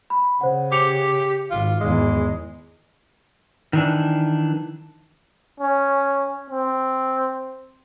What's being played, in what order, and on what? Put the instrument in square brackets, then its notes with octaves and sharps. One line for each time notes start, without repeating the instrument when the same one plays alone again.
[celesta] B5
[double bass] C#3 [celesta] C5 F#5
[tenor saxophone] G4 [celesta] D6 C#7 F7
[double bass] G#1 [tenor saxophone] F4
[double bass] G#1 E2 [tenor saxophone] G#3
[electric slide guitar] D#3 E3 D4
[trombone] C#4
C4